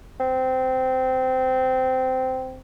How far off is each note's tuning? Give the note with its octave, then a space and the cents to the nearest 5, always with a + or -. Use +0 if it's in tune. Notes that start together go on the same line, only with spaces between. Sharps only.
C4 -15